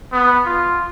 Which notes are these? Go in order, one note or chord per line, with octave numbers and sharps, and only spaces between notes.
B3
F4